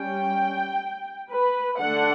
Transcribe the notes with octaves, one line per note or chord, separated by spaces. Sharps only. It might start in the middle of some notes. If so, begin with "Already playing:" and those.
Already playing: G3 C#4 G5
B4
D3 A3 D4 F#5